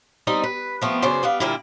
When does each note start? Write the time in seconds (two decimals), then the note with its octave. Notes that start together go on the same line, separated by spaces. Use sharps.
0.27 G3 C4 D#4 D#5
0.44 B4
0.82 F3 A3 B3 C4
1.02 F#2 C#3 B3 G#4 C5 D5
1.23 G3 B3 D5 F5
1.40 A#2 D3 G3 A#3 E4